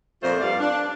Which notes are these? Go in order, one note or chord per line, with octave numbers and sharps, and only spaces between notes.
F2 A#2 A3 F4 C5
G2 G3 D5 F5
D4